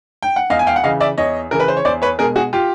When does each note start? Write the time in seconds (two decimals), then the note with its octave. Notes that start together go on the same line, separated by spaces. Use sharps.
0.22 G5
0.36 F#5
0.50 E2 D#5 F5
0.59 G#5
0.67 F5 G5
0.76 F#5
0.83 C#3 E3 D#5 F5
1.00 D5 E5
1.18 E2 C#5 D#5
1.51 C#3 E3 A#4
1.60 B4
1.68 C5
1.77 C#5
1.85 E2 C5 D5
2.02 B4 C#5
2.19 B2 G#3 G#4 A#4
2.36 F#4 G#4
2.53 F4 G4